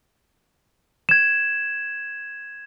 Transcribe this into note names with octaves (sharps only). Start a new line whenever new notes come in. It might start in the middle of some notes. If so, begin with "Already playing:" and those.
G#6 E7